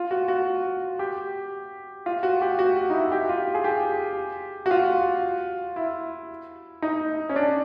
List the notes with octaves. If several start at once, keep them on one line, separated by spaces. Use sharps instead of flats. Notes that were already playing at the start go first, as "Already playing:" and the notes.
Already playing: F4
F#4
F#4
G4
F4
F#4
G4
F#4
D#4
E4
G4
F4
G#4
G4
F#4
F4
E4
D#4
C#4
D4